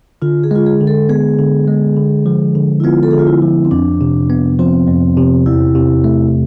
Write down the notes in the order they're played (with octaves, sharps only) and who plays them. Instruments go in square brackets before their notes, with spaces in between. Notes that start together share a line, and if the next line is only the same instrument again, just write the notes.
[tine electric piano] D3 [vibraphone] F4
[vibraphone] G#4
[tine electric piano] G#3 [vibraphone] F4
[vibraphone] G#4
[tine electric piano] D3
[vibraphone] A4
[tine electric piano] B3 [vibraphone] G#4
[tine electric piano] D3
G#3
D3
F3
D3
[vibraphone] E4
[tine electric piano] B3 [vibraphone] F4
[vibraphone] A4
[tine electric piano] D3 [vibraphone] G#4
[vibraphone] F4
E4
[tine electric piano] F3
[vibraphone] C4
[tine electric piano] F2 [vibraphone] D4
[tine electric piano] C3
B3
[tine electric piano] F3 [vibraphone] C4
[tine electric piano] F2
C3
[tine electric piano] E2 [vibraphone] E4
[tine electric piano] C3
A3